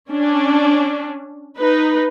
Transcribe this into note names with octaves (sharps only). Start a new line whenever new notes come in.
C#4 D4
D#4 B4